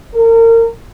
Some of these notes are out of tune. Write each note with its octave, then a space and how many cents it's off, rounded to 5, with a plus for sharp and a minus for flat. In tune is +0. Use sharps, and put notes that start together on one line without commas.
A#4 -30